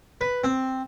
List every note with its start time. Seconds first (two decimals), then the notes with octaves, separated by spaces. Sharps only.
0.21 B4
0.44 C4